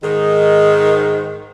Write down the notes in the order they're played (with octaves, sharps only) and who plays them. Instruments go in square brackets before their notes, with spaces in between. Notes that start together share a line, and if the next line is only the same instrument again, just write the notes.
[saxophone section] G#2 D#3